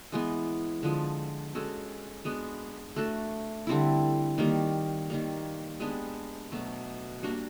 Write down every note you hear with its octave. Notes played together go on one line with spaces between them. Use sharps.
E3 G#3 B3
D3 F3 G#3
G#3 C#4 F#4 A4
G#3 B3 D4 F#4
A3 D4 F#4 A4
D3 G3 C4 E4
D#3 G3 A#3
D#3 G3 A#3
G#3 B3 D4 G4
B2 F#3 A3
G3 A#3 D4 F#4